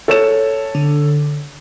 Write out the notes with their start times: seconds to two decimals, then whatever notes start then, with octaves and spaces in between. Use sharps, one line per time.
0.08 A4 C#5 E7
0.75 D3